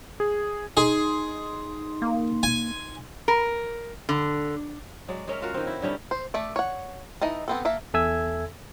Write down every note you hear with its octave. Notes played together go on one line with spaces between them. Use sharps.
G#4
D#4 G#4 C6
A#3
G#5
A#4
D3
F#3 G#3 D5
G#3 C#4 A#4 E5
F4 F#4 A#4
D#3 C4
E4
D3 G3 C#4 D#4
C5
A3 A4 D5
C#5 F#5
E3 D#4 D#5 A5
B3 C4 A4
A#3 A4 E5
E2 A4 E5 G#5 E6 G#6